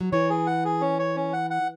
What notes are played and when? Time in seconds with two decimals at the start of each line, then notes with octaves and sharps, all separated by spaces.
0.01 F#3
0.12 E3 C#5
0.30 G#4
0.47 F#5
0.65 G#4
0.81 C#4
0.99 C#5
1.16 C#4
1.33 F#5
1.50 F#5